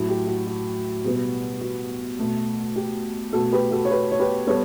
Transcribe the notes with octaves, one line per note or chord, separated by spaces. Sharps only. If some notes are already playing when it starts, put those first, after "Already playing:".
Already playing: A2 F#3 A3
G4
F#4
F#4
B2 G3 B3
F#4
B2 A3
G4
B2 A3 F#4 A4
G4 B4
F#4 A4
C#5
G4 B4
C#5
G4 B4
G3 B3 A4 C#5